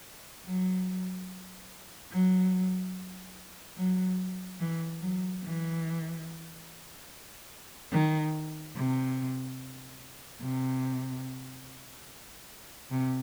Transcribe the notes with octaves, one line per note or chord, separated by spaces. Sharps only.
F#3
F#3
F#3
E3
F#3
E3
D#3
C3
C3
C3